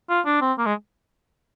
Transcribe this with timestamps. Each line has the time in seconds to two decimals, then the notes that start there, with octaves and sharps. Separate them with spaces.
0.09 F4
0.25 D4
0.41 C4
0.58 A#3
0.66 G#3